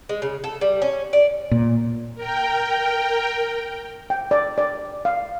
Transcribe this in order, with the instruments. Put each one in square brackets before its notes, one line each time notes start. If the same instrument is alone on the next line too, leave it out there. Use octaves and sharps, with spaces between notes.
[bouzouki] G#3
C#3
A4
G3
C#4
D5
[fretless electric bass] A#2
[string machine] A#4 G5
[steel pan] G5
D5
D5
F5